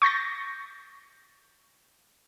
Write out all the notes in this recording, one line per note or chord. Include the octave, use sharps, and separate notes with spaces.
C#6 G6 A6 A#6